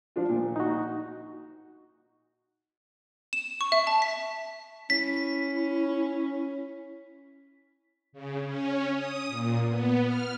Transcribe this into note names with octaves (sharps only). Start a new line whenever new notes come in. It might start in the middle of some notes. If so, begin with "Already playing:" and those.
F3 D4 F4
A#2
D#4 F#4
E7
C#6
E5
A5
B6
C#4 E4 B6
C#3
C#4
D#6
A#2
B3
F6